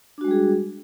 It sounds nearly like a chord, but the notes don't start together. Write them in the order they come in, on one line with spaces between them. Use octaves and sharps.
D4 F#4 G#3 G3 G#4